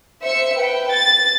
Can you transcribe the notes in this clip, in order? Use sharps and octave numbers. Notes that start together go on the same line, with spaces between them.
C5 E5 C#7
B4 G5
A6